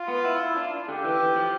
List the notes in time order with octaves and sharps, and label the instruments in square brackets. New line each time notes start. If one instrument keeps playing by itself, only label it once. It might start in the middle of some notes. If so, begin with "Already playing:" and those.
Already playing: [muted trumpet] F4
[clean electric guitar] B3
E4
E4
D4
[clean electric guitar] D3 [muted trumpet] G4
[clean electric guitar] E3
E3
F3